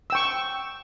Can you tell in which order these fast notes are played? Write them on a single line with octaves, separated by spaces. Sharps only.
E6 G5 C#6